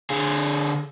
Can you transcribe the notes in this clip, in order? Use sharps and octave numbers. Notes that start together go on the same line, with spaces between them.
D3 G#4